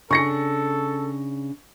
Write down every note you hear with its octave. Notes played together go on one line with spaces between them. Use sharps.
C#3 D4 A4 C#6 A#6 C#7